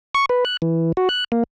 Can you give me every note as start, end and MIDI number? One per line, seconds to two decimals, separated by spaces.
0.15 0.26 85
0.29 0.44 71
0.45 0.57 90
0.62 0.92 52
0.97 1.09 66
1.09 1.24 90
1.32 1.44 58